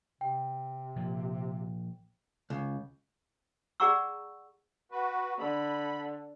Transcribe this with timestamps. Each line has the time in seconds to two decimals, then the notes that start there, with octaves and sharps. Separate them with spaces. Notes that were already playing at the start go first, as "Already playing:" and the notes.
0.21 C3 G5
0.96 A#2 F3
2.50 C#2
3.80 G#4 D5 F#5 A#5 C#6 E6
4.91 F#4 B4
5.39 D3 B5